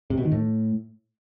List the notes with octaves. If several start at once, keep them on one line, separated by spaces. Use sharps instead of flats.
C3
B2
D#3
A2